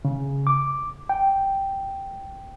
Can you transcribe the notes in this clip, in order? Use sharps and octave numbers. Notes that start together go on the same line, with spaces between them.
C#3
D6
G5